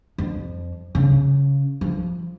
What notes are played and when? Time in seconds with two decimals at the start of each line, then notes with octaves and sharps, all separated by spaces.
0.18 F2
0.95 C#3
1.81 F3